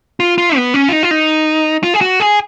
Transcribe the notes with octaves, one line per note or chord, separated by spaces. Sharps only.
F4
F4
B3
C#4
F4
D#4
F4
D#4
F4
G#4
F#4
G#4